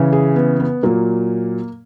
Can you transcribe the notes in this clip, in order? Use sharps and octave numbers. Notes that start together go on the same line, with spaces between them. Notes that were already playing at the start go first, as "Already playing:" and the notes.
Already playing: C#3 E3
G#4
B3
B3
A#2 F#3 A#3